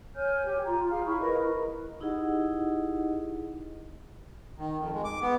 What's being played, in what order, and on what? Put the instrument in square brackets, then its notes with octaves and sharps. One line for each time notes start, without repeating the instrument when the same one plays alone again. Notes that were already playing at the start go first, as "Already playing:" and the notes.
[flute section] C#5 G#5 F6 G6
G4 G6
F4 A#5
G#4 F5 G5 F6
E4 B5 C#6
A#4 B4 D#5
[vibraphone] D#4 E4 G4 G#4 D#5 F#5
[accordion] D#3
F2
G#3
D6
B3